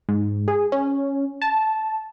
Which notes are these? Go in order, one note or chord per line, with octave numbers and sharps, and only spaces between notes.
G#2
G#4
C#4
A5